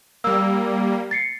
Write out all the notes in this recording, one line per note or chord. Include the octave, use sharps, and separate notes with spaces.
G3 A#3 E6
A6 C7 C#7